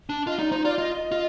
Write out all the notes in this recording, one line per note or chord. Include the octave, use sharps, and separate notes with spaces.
D4
F4 D#5
D#4 D5
D#4 C5
F4 D5
F4 D#5
F4